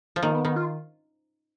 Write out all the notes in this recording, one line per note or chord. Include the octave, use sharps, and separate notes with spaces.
F3
D#3 A#3
B3
D#3 B3
F4